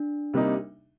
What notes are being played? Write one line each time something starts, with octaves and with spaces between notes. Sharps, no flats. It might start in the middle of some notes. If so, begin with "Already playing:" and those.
Already playing: D4
C3 G3 A#3 D#4